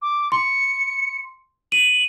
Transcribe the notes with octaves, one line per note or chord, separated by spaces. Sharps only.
D6
C6 C#7
D#7 F#7